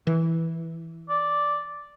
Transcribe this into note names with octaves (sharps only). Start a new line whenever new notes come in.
E3
D5